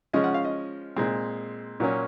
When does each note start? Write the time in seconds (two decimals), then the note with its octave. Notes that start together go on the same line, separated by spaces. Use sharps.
0.13 C#3 F3 G#3 C#4 D#5
0.24 F#5
0.34 F5
0.45 D#5
0.96 A#2 G#3 C4
1.80 A#2 F#3 A#3 C#4